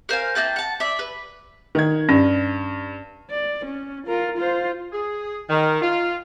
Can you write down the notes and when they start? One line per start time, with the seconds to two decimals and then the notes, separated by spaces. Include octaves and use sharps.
0.09 A#4 C5 F5 G#5
0.35 A#3 E4 G5 A5
0.56 F#5 A5
0.80 D5 E5
0.99 B4
1.75 D#3 G#6
2.09 G2 C#4
3.30 D5
3.65 C#4
4.07 F4 A#4
4.37 F4 C5
4.93 G#4
5.49 D#3
5.81 F4